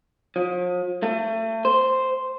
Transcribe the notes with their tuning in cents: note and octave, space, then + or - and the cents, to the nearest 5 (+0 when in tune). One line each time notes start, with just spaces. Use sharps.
F3 +40
A3 +30
C5 -5